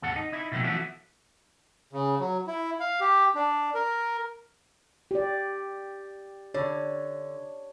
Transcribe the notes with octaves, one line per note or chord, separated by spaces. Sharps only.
D#2 G#2 A4 F#5
D#4
D#4 E4
B2 D#3 F3 A3
E3 F3 A3 B3 C#4 F#4
C#3
F#3
E4
F5
G4
D4
A#4
G4 D5
D3 C#5